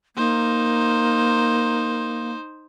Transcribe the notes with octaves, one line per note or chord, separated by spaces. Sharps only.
A#3 D#4 C5